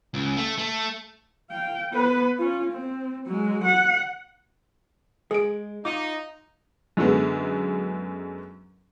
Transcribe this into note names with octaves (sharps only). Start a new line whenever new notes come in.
C#2
A3
A3
F5 G5
B3 B4
C#4 F4
C4
F#3 G#3
F#5
G#3 G#4 D7
D#4 F4 D6
F#2 D3 F#3 G#3 B3